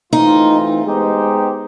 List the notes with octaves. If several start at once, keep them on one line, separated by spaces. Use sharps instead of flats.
E3 A3 C4 D#4 F4
G#3 B3 D#4 G4 C5